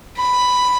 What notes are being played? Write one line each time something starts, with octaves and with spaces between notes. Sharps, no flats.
B5